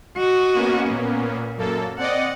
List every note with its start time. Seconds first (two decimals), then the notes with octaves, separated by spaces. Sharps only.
0.17 F#4 D#5
0.54 A#3 B3 C#4
0.91 A#2
1.57 F#2 A#3 A4
1.98 C4 D5 D#5 F#5